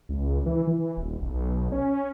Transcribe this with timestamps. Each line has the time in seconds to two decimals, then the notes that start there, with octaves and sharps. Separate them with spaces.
0.09 C#2
0.46 E3
0.67 E3
0.97 D#1
1.22 B1
1.72 C#4